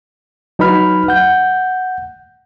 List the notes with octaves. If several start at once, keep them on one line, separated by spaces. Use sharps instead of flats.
F#3 D#4 B4 B5 F6
F#5 G6